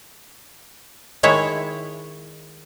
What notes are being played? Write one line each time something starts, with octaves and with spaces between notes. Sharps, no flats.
D#3 G#3 E4 C#5